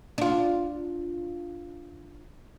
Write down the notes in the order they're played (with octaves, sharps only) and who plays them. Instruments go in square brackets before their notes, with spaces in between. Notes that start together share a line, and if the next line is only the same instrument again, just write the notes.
[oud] D4 F4